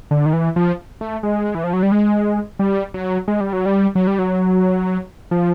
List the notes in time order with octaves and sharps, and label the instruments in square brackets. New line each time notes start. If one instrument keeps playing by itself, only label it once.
[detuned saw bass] D3
D#3
E3
F3
A3
G#3
E3
F3
F#3
G3
G#3
G3
F#3
G#3
G3
F#3
G3
F#3
G3
F#3
F3